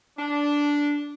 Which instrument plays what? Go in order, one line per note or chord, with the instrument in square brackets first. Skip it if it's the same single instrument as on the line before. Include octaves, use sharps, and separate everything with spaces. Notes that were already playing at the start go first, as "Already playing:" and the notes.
[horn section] D4